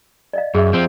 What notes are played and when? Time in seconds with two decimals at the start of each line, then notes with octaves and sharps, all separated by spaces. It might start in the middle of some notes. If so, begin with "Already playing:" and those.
0.33 D5 D#5 F5
0.55 F#2 G#4 E5
0.73 F3 C4